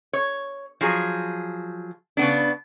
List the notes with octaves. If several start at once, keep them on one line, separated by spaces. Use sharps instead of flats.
C#5
F3 F#3 G#4
C#3 B3 D4